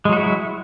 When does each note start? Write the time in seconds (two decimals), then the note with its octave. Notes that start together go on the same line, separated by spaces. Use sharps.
0.05 G#3
0.09 F#3
0.13 F#4
0.16 E4